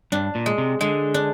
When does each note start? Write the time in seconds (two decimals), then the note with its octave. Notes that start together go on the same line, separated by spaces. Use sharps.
0.12 G2 D4
0.35 A#2
0.46 G#3
0.58 C3
0.81 D3 G#3
1.14 D4